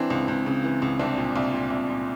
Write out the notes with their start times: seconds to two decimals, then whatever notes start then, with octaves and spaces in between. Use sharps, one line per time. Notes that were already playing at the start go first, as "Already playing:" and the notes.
Already playing: E3 C4 D4
0.10 C#2
0.28 C#2
0.46 C#3
0.64 E3
0.82 C#2
0.99 C2 C4 D4
1.17 A#2
1.36 C2
1.53 A#2
1.70 C2
1.89 A#2